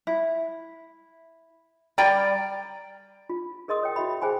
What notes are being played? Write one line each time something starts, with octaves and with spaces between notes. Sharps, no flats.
E4
G3 D5 G5 A#5
F4
G#4 A#4 D#5 C6 D#6
C#5 G5
E4 F#4 E5 B5
G#4 C5 G5 G#5 B5